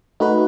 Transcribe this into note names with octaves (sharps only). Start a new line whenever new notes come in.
A3 D#4 F#4 B4